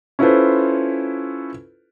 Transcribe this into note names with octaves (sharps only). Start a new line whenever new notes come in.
C#4 E4 F4 A4 B4 C5